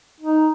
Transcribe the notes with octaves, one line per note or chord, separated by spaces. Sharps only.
D#4